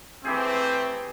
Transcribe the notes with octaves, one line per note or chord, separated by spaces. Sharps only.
E3 A3 C4 G4 G#4